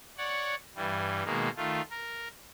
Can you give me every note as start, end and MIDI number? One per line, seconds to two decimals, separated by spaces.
0.18 0.55 73
0.18 0.55 74
0.18 0.55 78
0.75 1.23 43
0.75 1.23 52
0.75 1.23 55
1.24 1.49 47
1.24 1.49 51
1.24 1.49 56
1.24 1.49 58
1.56 1.81 51
1.56 1.81 57
1.56 1.81 65
1.91 2.28 70